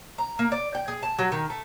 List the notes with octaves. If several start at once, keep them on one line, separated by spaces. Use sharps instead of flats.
A#5
A#3
D5
G5
G#4
A5
F#3
D#3
A3